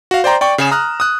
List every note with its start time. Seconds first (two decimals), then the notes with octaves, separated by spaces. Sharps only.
0.11 F#4 F5
0.24 C5 D5 G5 A#5 C6
0.41 D5 G5 C#6
0.58 C#3 G#4 E7
0.71 A#5 D#6 F6 F#6
1.00 D#6 F#6